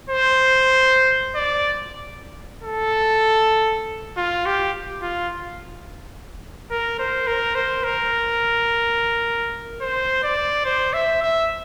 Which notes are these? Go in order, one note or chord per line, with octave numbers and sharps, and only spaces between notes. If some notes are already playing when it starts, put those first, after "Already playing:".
C5
D5
A4
F4
G4
F4
A#4
C5
A#4
C5
A#4
C5
D5
C5
E5
E5